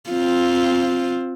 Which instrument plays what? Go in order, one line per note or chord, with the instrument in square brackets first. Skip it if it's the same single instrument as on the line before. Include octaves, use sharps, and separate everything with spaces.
[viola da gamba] C4 F4